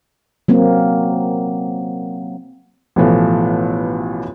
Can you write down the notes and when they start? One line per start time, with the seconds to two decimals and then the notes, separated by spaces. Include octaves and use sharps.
0.48 F#3 A#3 C4
2.96 A1 B2 E3 F3 A3